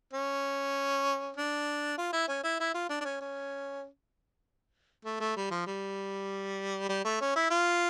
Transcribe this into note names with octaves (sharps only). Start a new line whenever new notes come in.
C#4
D4
F4
E4
C#4
E4
E4
F4
D4
D4
C#4
C#4
A3
A3
G3
F3
G3
G3
A3
C#4
E4
F4